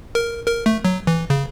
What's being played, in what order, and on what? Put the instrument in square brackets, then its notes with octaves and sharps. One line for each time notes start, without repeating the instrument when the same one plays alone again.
[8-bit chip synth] A#4
A#4
A3
F#3
E3
C#3